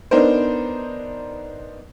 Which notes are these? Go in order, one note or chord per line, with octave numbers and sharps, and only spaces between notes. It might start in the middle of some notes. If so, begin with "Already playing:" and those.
B3 D4 D#4 A#4 C5